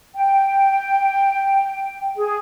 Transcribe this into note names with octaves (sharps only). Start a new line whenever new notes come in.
G5
G#4